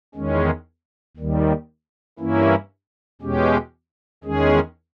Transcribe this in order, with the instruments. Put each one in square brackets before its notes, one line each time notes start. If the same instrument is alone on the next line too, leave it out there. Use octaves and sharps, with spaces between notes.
[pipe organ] E2 D#3 G#3 C#4
D#2 D#3 G3
G2 E3 A#3 C#4 E4
E2 B2 G#3 C#4 G4
E2 D#3 G#3 C#4 G#4